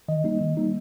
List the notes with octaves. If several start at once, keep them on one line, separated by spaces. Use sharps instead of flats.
D#3 D#5
G3 A#3 D#4
D#3
G3 A#3 D#4